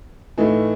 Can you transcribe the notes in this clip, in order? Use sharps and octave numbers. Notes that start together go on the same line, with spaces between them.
A2 E3 A3 D#4